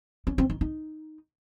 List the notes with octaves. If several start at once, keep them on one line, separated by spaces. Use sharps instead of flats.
C#4
C4
D#4
D#4